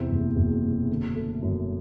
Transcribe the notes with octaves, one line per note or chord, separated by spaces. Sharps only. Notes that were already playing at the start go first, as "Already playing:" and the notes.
Already playing: E2 C3 C4
F#1
F#1
B2
D3
A3
F#2